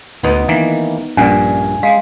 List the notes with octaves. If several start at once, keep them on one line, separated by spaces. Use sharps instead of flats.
D2 B3 D#4
D#3 E3 A#3
A#1 G2 A#2 C#4 D4 D5 G#5
G#3 F5